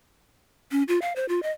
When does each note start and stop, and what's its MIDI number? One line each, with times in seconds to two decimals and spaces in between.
0.71 0.83 61
0.88 0.99 65
1.02 1.15 77
1.16 1.26 72
1.29 1.42 65
1.43 1.51 75